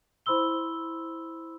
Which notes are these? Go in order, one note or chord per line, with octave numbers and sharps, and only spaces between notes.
E4 C5 B5 C6 E6 G7